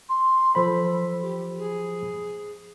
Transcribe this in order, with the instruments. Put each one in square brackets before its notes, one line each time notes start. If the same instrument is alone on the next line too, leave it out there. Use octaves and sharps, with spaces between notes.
[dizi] C6
[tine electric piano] F3 C5 B5 [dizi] A4
[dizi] G4
G#4